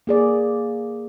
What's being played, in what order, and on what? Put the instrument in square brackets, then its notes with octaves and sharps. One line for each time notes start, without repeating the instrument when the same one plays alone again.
[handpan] A#3 G#4 D5